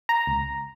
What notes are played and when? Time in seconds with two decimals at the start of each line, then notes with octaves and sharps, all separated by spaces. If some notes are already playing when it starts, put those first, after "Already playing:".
0.09 A#5
0.27 C#2